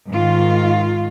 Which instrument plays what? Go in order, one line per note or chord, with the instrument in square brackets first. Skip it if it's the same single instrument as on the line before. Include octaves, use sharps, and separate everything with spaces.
[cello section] G#2 D#3 F4